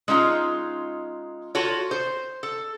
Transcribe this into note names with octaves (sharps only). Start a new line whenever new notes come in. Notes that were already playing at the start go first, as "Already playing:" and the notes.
G#3 C#4 D#4 F4
F4 F#4 A4 C#5
C5
A4